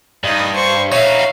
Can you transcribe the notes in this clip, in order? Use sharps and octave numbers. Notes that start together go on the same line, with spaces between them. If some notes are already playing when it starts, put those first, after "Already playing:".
G2 D#4 D#5
C5 C#6
D#4 F#4 C#5 E5 F5